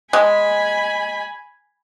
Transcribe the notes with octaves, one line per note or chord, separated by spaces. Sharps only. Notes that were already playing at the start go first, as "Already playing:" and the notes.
G#3 G#5 B5